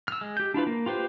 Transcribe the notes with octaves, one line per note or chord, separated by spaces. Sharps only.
E6 F6
G#3
G4 G6
D4 E4 F4 B4
A#3
F4 G4 B4 C5